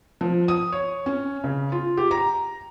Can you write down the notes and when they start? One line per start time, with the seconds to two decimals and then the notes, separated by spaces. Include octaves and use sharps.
0.21 F3
0.48 D#6
0.72 C#5
1.06 C#4
1.44 C#3
1.72 F4
1.97 G4
2.11 A#5